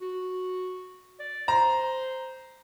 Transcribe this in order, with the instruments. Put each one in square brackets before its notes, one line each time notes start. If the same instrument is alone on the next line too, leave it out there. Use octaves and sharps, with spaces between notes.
[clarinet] F#4
D5
[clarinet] C5 [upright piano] A#5